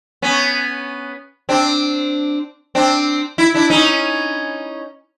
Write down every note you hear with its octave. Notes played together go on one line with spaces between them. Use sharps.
B3 C#4
C4 D4
C4 D4
E4
D4 E4
C#4 D#4